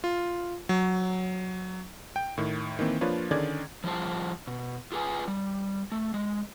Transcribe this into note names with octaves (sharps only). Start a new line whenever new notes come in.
F4
F#3
G5
A2 D#3
D#3 E3 A#3 C4
F3 A#3 D4 F4 B4 C#5
D3 D#3 C#4 G#4 D5 G#6
F3 G3 F4 G#4 C5 A5
B2
F4 G#4 B4 G#5
G3
A3
G#3